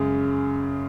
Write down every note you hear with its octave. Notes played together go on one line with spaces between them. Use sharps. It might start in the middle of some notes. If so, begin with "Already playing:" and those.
Already playing: F#2 C#3 G#3